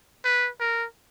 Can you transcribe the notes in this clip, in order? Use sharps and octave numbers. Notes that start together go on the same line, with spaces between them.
B4
A#4